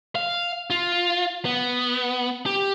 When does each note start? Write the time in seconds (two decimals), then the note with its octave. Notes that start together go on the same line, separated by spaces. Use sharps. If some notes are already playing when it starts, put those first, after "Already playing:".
0.15 F5
0.70 F4
1.45 B3
2.46 G4